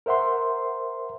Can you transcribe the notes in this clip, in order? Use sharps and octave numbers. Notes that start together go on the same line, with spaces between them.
A#4 C5 E5 F#5 C6